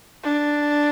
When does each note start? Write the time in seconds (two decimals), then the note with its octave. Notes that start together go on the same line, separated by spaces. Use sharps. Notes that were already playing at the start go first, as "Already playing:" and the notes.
0.24 D4